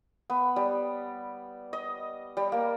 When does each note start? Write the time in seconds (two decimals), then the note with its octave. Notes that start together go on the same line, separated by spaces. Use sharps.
0.30 B3
0.56 G3
1.73 D#5
2.37 G3
2.52 A#3